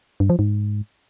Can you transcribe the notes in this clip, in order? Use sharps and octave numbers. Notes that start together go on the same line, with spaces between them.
G2
F3
G#2